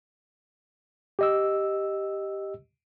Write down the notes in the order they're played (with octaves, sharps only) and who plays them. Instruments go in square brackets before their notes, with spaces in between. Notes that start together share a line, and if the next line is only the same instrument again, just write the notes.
[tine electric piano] G4 D#5 E6